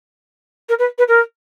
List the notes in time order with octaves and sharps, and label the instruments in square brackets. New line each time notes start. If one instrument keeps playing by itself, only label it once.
[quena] A#4
B4
B4
A#4